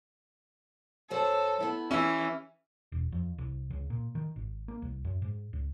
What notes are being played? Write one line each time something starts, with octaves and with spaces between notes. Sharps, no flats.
F#2 F#3 A4 C5
B3 E4
E3 C#4 G4 E5
E1
F2
C2
C#2
A#2
D#3
G#1
A#3
C2
F#2
G#2
C#2